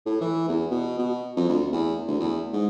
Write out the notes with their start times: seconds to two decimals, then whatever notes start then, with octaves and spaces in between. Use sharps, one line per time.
0.06 A2
0.21 E3
0.48 E2
0.71 B2
0.99 B2
1.37 F2
1.49 D2
1.72 E2
2.07 D2
2.20 E2
2.53 G#2